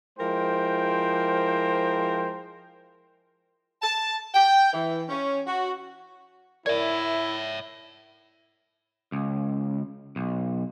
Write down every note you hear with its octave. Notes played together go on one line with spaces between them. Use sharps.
F3 G#3 E4 A#4 C5 G5
A5
G5
E3
C#4
F#4
E4 A#4 C#5 D5 E5 G#6
C#2
B1